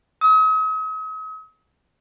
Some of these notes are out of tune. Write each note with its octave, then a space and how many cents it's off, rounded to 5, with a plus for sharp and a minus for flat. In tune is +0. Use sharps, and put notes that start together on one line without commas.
D#6 +45